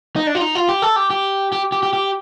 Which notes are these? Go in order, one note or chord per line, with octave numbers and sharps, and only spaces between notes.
D#4
D4
F4
D#4
F4
G4
A4
G4
G4
G4
G4
G4
G4